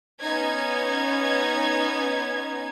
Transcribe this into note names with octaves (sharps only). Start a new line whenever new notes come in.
B3 C#4 D#4 G#6